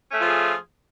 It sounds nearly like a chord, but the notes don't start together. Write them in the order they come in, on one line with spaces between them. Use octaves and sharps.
C#4 A3 F4 F3 G#4